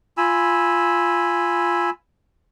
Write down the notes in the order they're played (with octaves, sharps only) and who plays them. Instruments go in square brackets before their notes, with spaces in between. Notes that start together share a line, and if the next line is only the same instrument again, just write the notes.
[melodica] F4 G#5 B5 E6